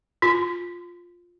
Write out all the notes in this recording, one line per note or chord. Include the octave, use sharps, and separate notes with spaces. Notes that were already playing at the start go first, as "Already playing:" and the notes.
F4